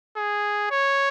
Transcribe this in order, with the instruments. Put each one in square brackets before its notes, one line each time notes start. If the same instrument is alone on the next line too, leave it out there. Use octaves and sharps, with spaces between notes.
[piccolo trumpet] G#4
C#5